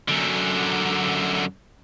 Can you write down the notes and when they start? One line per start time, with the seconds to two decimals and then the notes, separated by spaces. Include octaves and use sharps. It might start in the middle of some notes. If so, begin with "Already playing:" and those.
0.08 F#2 D3